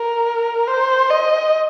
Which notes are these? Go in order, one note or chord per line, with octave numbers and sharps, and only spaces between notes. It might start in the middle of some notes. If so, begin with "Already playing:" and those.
Already playing: A#4
C5
D#5